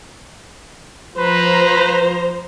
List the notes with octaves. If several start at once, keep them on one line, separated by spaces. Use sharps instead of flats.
F3 B4 C5 A#5